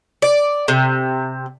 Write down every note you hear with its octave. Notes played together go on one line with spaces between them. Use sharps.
D5
C3